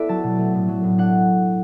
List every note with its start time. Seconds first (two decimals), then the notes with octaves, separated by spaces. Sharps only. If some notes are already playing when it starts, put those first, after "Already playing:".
Already playing: B3 E4 A4 B4 D5 E5
0.09 F#3 A5
0.23 B2
0.39 A3
0.54 A2
0.68 F#3
0.84 A2
0.98 D4 F#5